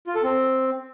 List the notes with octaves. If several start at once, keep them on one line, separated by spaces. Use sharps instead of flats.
F4
A4
C4